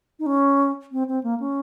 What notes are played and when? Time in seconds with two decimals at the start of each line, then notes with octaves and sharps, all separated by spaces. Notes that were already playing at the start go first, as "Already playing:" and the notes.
0.19 D#4
0.26 C#4
0.92 C4
1.08 C4
1.23 A#3
1.40 C#4